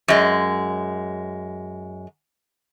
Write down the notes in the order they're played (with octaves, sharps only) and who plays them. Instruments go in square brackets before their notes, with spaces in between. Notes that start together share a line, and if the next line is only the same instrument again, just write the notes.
[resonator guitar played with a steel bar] F#2 G#3